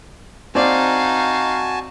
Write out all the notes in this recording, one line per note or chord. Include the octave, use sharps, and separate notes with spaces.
C4 D#4 F#4 D5 F5 G#5 A5